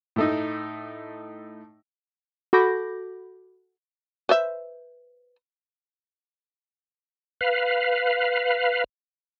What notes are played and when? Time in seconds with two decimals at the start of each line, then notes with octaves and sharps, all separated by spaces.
0.16 A2 A3 D#4
2.53 F#4 A4 B5 D6 G6 A#6
4.29 B4 C5 E5
7.41 B4 F5